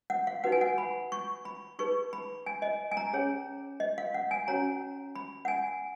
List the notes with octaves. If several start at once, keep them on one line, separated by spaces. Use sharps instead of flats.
F#5
F5
D#4 F#4 B4 F#5
G#5
F#5
B5
C#6
B5
D#4 G#4 B4 C#6
B5
G#5
D#5
G#5
A#5
C#4 G#4 C#5
D#5
F5
F#5
G#5
C#4 F#4 C#5 A#5
B5
F#5
G#5